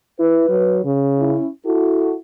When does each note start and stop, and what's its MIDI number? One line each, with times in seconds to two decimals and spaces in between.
0.19 0.47 64
0.19 0.84 71
0.49 0.81 54
0.85 1.37 49
1.18 1.47 61
1.18 1.47 64
1.66 2.17 64
1.66 2.14 66
1.66 2.14 69